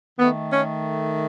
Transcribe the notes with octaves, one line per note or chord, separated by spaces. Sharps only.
D#3 A3 B3
C#4